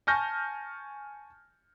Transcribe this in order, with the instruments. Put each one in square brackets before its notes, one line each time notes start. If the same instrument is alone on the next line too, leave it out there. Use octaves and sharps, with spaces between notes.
[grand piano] G#5 A5 C#6 F6 G6 A#6